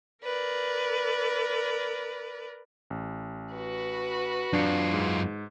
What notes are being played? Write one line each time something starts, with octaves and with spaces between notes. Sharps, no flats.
A#4 B4 D5
A1
F#4 B4
F#2 D4 F4 C#7
G#2